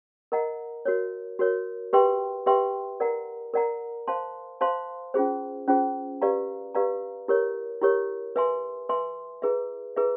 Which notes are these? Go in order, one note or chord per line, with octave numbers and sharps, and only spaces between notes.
A#4 D#5 F#5 A#5
F#4 A#4 C#5
F#4 A#4 C#5
G4 B4 E5 G5 C6
G4 B4 E5 G5 C6
A#4 D5 F#5 A#5
A#4 D5 F#5 A#5
C5 F5 A5 C6
C5 F5 A5 C6
C#4 F4 G#4 C5
C#4 F4 G#4 C5
G4 B4 D5 F5 A#5
G4 B4 D5 F5 A#5
E4 G4 A#4 C#5
E4 G4 A#4 C#5
B4 E5 G#5 C6
B4 E5 G#5 C6
E4 G#4 B4 E5
E4 G#4 B4 E5